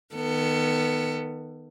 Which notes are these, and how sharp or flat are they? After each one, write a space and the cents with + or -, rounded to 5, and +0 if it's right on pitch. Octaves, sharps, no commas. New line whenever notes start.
D#3 +0 B3 +0 A4 +30